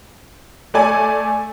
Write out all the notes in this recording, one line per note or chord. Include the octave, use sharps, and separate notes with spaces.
A3 D5 G#5